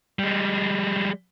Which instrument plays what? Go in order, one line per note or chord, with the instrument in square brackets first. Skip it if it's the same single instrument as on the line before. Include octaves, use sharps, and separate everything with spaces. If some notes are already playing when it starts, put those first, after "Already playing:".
[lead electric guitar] G3 G#3